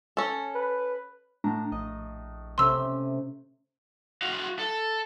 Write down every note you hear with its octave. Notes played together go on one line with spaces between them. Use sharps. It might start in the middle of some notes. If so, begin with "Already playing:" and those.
C#4 A4
B4
A2 D4 A#5
A#1 D#5
C3 A3 C#4 C6 E6
F#4 F5
A4